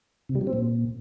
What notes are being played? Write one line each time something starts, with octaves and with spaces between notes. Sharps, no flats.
C3
G3
F#3
C4
A#2